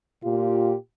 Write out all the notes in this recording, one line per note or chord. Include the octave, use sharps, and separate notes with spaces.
A#2 F4 G4